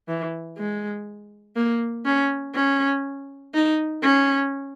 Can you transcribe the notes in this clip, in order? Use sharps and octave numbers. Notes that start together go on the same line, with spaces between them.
E3
G#3
A#3
C#4
C#4
D#4
C#4